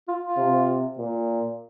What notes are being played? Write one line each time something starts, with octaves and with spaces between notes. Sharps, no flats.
F4
F4
C3
A#2